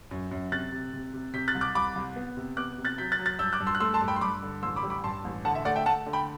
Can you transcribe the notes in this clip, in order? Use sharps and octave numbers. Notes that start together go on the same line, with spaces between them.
F#2
F#2
C3 F#6 A6
C3
C3
C3
C3 G6 B6
F#6 A6
C2
D6 F#6
C2 B5 D6
C2
B3
C3
B3 D6 F#6
C3
F#6 A6
F#3 G6 B6
F#6 A6
F#3
F#6 A6
G2 E6 G6
D6 F#6
G2
C6 E6
F#6
A3 C6 E6
A5 C6
G2
G5 B5
C6
G2 B5 D6
D3
A1 C6 E6
B5 D6
G3
B5 D6
G2 A5 C6
A1
D3 F#5 A5
E5
A3 D5 F#5
E5 G5
A3 F#5 A5
D3
G5 B5